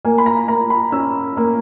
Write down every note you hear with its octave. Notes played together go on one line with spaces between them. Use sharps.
A#3 G#5
B5
A#5
A#3 A#5
B5
C#4 E6
A#3